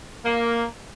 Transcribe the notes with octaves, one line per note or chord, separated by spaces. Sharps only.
A#3